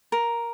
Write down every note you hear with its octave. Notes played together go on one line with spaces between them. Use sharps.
A#4